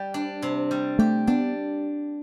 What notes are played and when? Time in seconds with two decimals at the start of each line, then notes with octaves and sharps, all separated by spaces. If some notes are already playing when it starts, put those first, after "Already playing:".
Already playing: G3 G4
0.14 D4
0.42 C3
0.71 G3
0.99 A3 G4
1.27 B3 D4